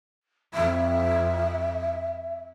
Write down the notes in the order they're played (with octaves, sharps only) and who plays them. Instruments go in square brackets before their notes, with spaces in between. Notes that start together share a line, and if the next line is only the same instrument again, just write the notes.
[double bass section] F2 [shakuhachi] E5